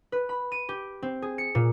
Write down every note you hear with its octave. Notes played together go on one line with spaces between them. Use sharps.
B4
B5
D#7
G4
C4
G#4
C#7
A#2